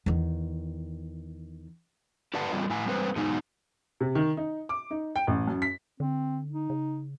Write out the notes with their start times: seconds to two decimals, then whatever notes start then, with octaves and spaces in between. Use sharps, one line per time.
0.06 E2 D#3
2.34 E4 G4 B4 D5 F#5 A5
2.52 G3 C4 F4 D#5
2.70 A2 E4 G#5
2.86 G3 G#3 C4 B4 C5
3.16 E2 B2 F#3 G#3 D#4 G#5
4.00 C3
4.15 D#3
4.37 D#4
4.69 D6
4.91 D#4
5.16 G5
5.27 A1
5.47 F#2
5.62 B6
6.00 D3 C4
6.52 D#4
6.70 C#3